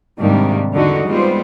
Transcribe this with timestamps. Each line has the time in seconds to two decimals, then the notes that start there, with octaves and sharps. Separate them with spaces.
0.19 G#2 C3 D#3 G3 A#3 D4
0.73 E2 D3 D#4 F#4
1.08 G3 G#3 B3 C4 F4 C5